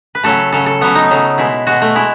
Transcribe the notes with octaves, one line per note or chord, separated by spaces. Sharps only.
B4
C#3 F#3 A3 A4
C#3 F#3 A3 A4
A4
C#3 F#3 A3 B3
D#4
C#3 F#3 A3
B2 G#3 E4
B2 G#3 F#4
A3
G#3 E4